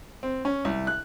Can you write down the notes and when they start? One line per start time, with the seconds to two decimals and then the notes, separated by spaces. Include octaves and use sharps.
0.23 C4
0.45 C#4
0.65 C2
0.87 F#6